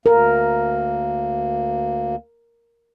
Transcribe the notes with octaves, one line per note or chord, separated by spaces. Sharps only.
D2 A#3 A#4